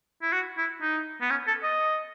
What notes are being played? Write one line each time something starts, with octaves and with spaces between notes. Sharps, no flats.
E4
F#4
E4
D#4
B3
C#4
A4
D#5